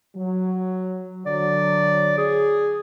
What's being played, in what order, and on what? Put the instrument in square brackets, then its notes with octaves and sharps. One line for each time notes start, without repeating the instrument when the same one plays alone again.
[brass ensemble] F#3
[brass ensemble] D3 F#3 [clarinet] D5
[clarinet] G#4